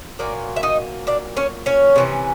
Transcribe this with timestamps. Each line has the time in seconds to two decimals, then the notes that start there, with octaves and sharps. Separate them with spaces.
0.19 A#2 F#3 A#3 D5
0.56 E5
0.63 D#4 D#5
1.07 D4 D5
1.37 C#4 C#5
1.66 C#4 C#5
1.96 C3 E3 A3 C#4